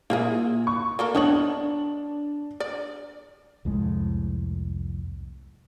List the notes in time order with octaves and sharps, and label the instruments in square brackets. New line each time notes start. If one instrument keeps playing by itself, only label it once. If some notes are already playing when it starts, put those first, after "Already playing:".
[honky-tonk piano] A#2 [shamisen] A#3 E4 G#4
[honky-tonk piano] C#6
[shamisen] A#3 A4 A#4
[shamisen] D#3 B3 C#5 [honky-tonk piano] D4 F#7
[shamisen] D5
[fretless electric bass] C2 F2 A2 G#3